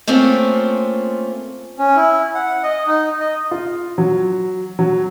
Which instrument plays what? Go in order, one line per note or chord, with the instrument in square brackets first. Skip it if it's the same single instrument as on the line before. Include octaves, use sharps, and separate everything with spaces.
[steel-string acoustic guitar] A3 A#3 C4 C#4 F4
[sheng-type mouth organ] C#4
E4
F#5
D#5
D#4
D#5
[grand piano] F4
F#3
F#3